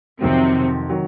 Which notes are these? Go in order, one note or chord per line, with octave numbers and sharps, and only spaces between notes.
F2 C3 D#3 F#3 C4
D#3 F#3